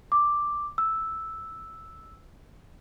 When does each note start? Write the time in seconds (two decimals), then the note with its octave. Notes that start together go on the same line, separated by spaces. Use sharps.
0.12 D6
0.78 E6